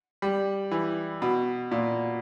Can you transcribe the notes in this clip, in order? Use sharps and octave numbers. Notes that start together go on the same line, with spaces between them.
G3
E3
B2
A#2